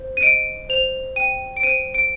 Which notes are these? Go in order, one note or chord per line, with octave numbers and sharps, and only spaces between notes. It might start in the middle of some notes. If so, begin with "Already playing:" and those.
Already playing: C5
D#7
D#5 D7
C5 F7
G5 D#7
D7
C5 D#7
D7